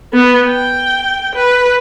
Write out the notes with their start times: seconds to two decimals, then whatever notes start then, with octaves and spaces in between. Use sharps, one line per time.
0.13 B3
0.49 G5
1.35 B4